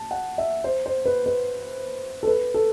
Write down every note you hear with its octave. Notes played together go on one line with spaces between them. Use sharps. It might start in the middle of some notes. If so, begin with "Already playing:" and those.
Already playing: A5
F#5
E5
C5
C5
B4
B4
A4
B4
A4